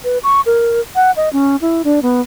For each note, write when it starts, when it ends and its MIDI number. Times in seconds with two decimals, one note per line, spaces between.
0.04 0.18 71
0.23 0.41 85
0.46 0.81 70
0.95 1.11 78
1.17 1.29 75
1.33 1.56 61
1.61 1.82 64
1.84 2.00 62
2.03 2.21 59